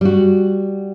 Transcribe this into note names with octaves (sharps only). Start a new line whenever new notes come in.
G3 F#4